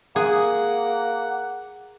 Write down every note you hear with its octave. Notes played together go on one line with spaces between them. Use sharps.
A#3 G#4 F#5